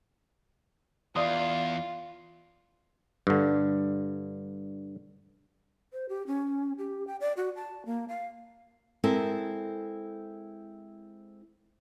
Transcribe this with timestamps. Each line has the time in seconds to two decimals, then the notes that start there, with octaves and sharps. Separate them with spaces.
1.16 E2 F4 D5 C6 D#6
3.27 G2 D3
5.92 C5
6.09 G4
6.27 C#4
6.78 G4
7.07 G5
7.21 D5
7.37 F#4
7.56 A5
7.86 A#3
8.09 F5
9.04 G#3 C4 E4 A4 A#4 E5